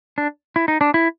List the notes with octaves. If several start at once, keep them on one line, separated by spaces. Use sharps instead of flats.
D4
E4
D#4
D4
E4